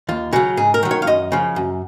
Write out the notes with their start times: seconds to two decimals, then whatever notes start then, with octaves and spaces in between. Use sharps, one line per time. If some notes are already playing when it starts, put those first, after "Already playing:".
0.08 D#2 F4
0.33 C#3 F#3 F#4
0.57 G#2 G#4
0.74 A#4
0.83 D#3 F#3
0.91 C#5
1.02 F5
1.07 F#2 D#5
1.32 C#3 F3
1.56 F#2